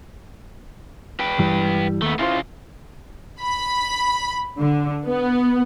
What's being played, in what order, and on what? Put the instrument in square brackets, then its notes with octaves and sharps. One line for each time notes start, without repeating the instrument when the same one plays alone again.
[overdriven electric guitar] B4 G5
[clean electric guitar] G2 E3 G3
[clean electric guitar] D#2 [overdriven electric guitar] A3 B3
[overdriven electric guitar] C#3 F4 [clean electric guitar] E4 C5
[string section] B5
D3
B3